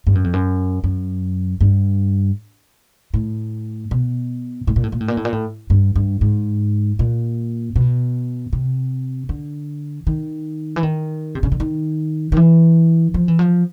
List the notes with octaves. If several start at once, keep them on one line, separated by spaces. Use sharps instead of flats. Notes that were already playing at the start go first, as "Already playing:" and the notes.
G2
F#2
F2
F#2
F#2
G2
A2
B2
A2
A#2
A2
A#2
A2
A#2
A2
A#2
A2
G2
G2
G#2
A#2
B2
C3
D3
D#3
E3
D#3
C3
C#3
D3
D#3
D#3
E3
F3
E3
F3